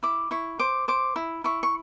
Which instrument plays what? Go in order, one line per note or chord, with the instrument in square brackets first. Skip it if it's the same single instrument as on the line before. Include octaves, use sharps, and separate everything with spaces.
[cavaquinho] E4 D6
E4 C#6
C5 D6
C5 D6
E4
E4 C#6
C#6